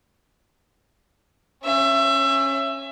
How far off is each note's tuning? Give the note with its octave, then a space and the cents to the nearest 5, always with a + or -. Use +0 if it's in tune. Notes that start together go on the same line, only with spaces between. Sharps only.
C#4 -15 E5 +25